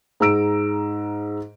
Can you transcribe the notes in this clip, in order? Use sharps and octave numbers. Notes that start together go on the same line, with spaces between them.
G#2 A#5 E6 D7